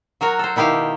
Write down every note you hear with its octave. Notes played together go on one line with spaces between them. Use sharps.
F#3 F#4 A#4 C#5
A4 C5
B2 D#3 E4 G4 F5